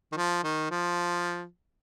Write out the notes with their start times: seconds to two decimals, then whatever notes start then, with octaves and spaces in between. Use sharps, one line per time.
0.12 D#3
0.17 F3
0.43 D#3
0.71 F3